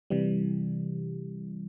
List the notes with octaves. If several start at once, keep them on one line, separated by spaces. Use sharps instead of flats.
C3 E3 G3